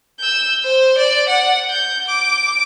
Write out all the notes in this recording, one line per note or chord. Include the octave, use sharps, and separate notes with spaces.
E6 G6
C5
D5
F#5
G6
D6